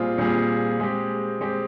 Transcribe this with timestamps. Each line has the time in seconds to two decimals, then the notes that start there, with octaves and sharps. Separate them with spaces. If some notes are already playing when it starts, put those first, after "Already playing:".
Already playing: A#2 G3 C4 F4 G#4
0.18 A#2 G3 C4 F4 G#4
0.80 G#3 C4 G4
1.41 G#3 C4 G4